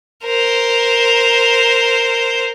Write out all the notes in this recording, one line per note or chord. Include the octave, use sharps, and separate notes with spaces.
A#4 C5